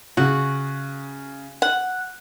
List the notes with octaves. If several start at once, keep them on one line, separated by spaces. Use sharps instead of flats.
C#3 F#4 F#6
F#5